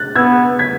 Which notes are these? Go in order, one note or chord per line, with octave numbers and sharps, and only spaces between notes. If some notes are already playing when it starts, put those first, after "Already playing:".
Already playing: F#6 A6
B3 E6 G#6
G#6 B6